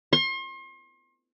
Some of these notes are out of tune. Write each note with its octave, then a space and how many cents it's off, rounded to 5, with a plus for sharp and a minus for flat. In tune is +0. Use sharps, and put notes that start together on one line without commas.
C6 +40